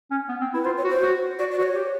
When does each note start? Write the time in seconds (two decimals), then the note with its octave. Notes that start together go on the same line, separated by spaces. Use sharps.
0.11 C#4
0.28 B3
0.41 C4
0.54 E4 B4
0.65 F4 C5
0.77 C#5
0.84 F#4
0.90 C5
1.02 F#4
1.39 F#4 D5
1.51 D5
1.58 F#4 C5
1.63 C#5
1.75 G4